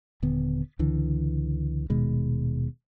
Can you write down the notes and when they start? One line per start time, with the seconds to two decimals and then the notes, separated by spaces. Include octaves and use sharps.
0.22 D#1 D3 B3
0.79 C#2 D3 E3
1.90 D#1 B2 D#3 G#3